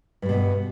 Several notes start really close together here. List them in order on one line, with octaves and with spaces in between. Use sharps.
G2 G3 B2